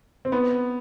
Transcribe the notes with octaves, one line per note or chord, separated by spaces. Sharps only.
C4
B3